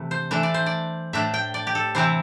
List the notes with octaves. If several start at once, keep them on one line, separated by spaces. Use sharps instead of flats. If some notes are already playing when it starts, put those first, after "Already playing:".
Already playing: C3 E3 A3
C5
E3 A3 D4 E5
D5
C5
D5
A2 A3 D4 E5
G5
D5
G4
A4
C3 E3 C4 E4 C5